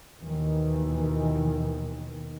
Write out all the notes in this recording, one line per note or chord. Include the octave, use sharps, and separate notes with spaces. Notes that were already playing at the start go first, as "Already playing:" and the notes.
D#2 B2 D#3 E3